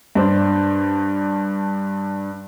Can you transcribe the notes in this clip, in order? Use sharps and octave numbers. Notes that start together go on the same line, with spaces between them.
G2 D4 C5